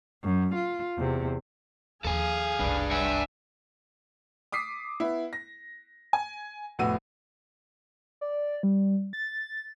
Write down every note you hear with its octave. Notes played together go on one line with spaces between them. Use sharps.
F#2
F4
E2 C3
D#2 F3 G#4 A4 F5 G#5
F#1 C2 D4 B4
E5 F#5 G#5
D6 D#6 B6 C7
B3 E4
A#6
G#5
F1 A2 B3 F#4 E6 D#7
D5
G3
A6